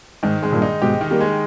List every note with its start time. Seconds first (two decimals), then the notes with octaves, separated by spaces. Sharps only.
0.23 G#2 D#3
0.42 G#2 G#3
0.52 G2 A#2
0.62 D#4
0.82 G#2 B2 G4
1.01 D#3
1.11 G3 A#3
1.20 G#3